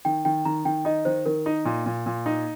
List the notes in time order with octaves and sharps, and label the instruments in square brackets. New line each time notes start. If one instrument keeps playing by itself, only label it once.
[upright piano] D#3 [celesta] G5
[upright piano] D#3 [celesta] G5
[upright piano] D#3 [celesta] A#5
[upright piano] D#3 [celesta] G5
[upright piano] D#4 [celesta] D#5
[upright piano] D#3 [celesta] C5
[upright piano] D#3 [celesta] A#4
[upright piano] D#4
A#2
A#2
A#2
D#4